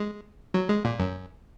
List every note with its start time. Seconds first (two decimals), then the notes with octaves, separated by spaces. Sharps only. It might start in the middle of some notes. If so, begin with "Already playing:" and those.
Already playing: G#3
0.54 F#3
0.69 G#3
0.85 A#2
0.99 F#2